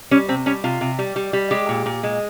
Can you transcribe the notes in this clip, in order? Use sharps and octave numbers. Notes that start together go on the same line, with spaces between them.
G3 C#4
C3 C4
G3 C#4
C3 F4
C3
G3
G3
G3
G#3 G4
A#2
A#2
G#3